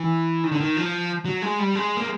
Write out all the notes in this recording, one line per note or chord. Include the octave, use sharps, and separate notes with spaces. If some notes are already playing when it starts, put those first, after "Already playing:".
Already playing: E3
D#3
D3
D#3
F3
F#3
G#3
G3
G#3
A#3